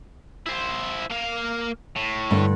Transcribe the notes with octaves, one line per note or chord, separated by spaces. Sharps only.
E4 C5
A#3 F5
A2
G2 D3